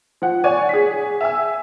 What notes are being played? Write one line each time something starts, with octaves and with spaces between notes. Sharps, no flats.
F3 F#5
C#5 D5 F#5 G#5 D#7
G#4 B6
E5 G#5 E6